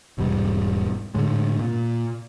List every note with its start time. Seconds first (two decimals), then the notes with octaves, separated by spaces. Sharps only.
0.18 E1 G#2 B2 G3
1.14 A2 D3 G#3
1.59 A#2